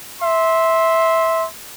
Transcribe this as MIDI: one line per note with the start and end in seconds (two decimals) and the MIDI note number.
0.22 1.46 76
0.22 1.46 84